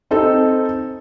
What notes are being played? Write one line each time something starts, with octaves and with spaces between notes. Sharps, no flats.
C4 D#4 A4